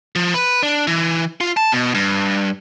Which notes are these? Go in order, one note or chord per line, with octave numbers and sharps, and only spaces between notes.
F3
B4
D4
E3
F4
A5
B2
G2